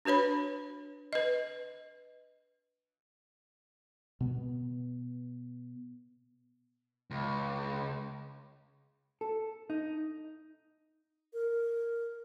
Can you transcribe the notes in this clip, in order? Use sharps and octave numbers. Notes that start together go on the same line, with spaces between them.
D4 F#4 B4 C#5 B5
B4 D#5
B2 B3
C#2
A4
D#4
A#4